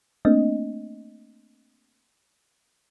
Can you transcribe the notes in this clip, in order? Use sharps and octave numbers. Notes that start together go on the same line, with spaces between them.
A3 A#3 C4 D4 D#5